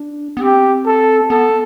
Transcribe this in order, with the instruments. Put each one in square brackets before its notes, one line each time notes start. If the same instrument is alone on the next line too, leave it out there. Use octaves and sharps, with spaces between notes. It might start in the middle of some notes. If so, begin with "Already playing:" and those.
Already playing: [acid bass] D4
B3
[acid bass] C4 [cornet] G4
[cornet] A4
[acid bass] B3 [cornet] A4